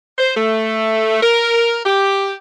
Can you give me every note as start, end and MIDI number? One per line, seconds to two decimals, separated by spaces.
0.19 0.34 72
0.35 1.21 57
1.22 1.80 70
1.85 2.33 67